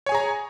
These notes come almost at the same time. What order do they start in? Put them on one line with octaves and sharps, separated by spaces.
C#5 G#5 G#4 A#5